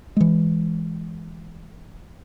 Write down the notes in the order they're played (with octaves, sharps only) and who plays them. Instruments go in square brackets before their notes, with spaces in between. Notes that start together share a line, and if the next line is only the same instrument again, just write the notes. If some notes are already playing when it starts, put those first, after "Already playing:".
[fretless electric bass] E3 G#3